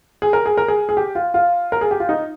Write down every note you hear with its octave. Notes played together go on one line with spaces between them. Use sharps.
G#4
A#4
G#4
A#4
G#4
G#4
G4
F4
F4
A#4
G#4
G4
F4
D#4